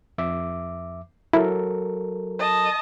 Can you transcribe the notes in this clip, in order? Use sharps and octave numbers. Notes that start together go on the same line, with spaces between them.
F2 E5 D6
F#3 E4 A4 A#4
D#5 A5